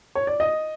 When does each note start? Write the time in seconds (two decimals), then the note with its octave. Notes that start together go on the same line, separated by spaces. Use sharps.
0.15 C#5
0.27 D5
0.40 D#5